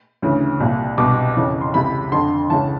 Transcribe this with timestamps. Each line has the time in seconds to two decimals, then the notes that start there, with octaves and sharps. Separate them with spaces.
0.22 D2 C#3 E3
0.60 C2 A#2
0.98 C2 B2 D6
1.36 F2 C#3 E3
1.61 C6
1.74 C#2 C3 E3 B5
2.12 F2 D3 C6
2.50 C#2 C#3 E3 A5